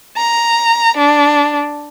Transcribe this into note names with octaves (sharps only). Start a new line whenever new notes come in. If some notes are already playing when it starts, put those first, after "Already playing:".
A#5
D4